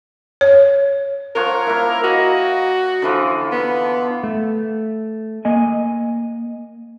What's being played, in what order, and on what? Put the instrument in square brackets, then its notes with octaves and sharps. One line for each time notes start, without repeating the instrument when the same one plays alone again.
[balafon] C#5
[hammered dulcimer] F3 C#5 F#5 [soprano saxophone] A#4
[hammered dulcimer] A#3 E4
[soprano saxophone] F#4 [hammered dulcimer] D#5
[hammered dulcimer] D3 E3 F3
[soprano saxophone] B3
[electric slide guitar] A3
A#3 D#5 G#5